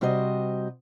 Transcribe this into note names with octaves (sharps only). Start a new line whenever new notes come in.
C3 G3 F#4 C5 D#5